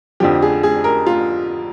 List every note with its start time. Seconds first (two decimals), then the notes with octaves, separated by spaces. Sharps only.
0.20 F2 D3 F3 G4
0.42 G#4
0.63 G#4
0.84 A#4
1.06 F4